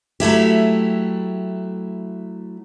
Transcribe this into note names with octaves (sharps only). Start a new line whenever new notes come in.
F#3 A3 E4 G4